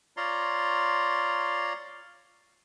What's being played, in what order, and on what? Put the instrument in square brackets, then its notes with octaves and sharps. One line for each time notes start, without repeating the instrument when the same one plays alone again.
[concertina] F4 C#5 D5 A#5 C6